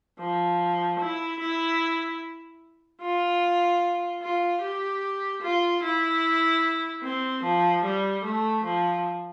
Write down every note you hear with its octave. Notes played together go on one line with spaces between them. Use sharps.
F3
E4
E4
F4
F4
G4
F4
E4
C4
F3
G3
A3
F3